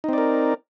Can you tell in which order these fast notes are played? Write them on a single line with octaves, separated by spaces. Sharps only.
D#4 C4 D5 A#4